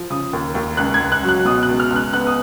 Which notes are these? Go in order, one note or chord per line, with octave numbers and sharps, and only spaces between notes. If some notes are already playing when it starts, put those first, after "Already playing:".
Already playing: F3
C#3 D#6
D#2
D#2
C#2 F#6
G#6
C#2
F#6
F#3
F#6
B2 D#6
F#6
C#2
F6
C#2
F#6
B3 F#6
D#6